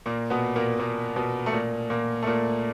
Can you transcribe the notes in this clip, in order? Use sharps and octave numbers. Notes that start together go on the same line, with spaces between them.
A#2 A#3
B2 B3
A#2 A#3
A#2 A#3
B2 B3
A3
A#2 A#3
A#2 A#3
A3
A#2 A#3